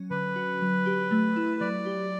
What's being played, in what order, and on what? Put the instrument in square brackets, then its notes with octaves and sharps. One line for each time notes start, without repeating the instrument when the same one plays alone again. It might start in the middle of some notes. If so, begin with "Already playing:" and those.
Already playing: [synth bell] F#3 C#4
[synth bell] D3 [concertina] B4
[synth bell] F#4
F#3
G4
A3
E4
[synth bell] F#3 [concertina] D5
[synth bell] G4